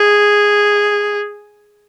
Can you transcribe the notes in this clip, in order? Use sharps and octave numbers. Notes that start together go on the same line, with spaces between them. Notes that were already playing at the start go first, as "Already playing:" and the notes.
Already playing: G#4